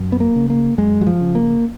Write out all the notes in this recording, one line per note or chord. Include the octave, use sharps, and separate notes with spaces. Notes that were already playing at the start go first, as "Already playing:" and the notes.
Already playing: F#2
B3
A#3
C#3
A#3
F#2 G#3
F#3
F3
C#3
A#3